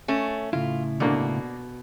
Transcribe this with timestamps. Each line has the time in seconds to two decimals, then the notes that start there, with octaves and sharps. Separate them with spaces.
0.08 A3 C#4
0.53 A2 C#3 E4 F4
1.00 B2 D3 A#3